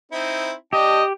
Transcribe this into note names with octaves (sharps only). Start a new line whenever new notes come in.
C4 D#4 E4
D4 G4 D#5 G5 A5